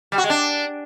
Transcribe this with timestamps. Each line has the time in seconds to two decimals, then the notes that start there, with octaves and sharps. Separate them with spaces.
0.12 G3
0.18 F#4
0.24 G#3
0.30 D4